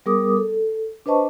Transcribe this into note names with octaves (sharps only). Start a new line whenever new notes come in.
G3 B3 G#4 A#4 D6 D#6
A4
D4 B4 C5 D#5 A5 C#6